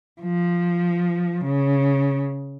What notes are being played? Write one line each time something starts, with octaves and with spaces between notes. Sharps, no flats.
F3
C#3